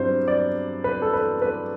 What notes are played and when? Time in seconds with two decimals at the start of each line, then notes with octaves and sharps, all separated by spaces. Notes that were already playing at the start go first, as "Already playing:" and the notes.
Already playing: G2 F#3 C4 E4 C5
0.28 D5
0.84 B4
1.02 A4
1.13 B4
1.42 B4